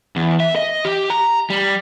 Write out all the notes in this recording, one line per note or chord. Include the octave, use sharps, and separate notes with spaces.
E2
E5
D#5
G4
A#5
G3